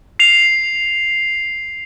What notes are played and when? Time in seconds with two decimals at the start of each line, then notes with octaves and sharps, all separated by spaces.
0.19 C7 F7